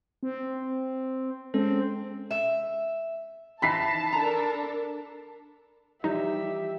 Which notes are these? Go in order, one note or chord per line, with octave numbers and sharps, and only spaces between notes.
C4
G#3 C4 C#4 A4
E5
E3 D#4 A5 B5 B6 C7
D4 A4 A#4 A#5
E3 F3 G3 D#4 G4 E5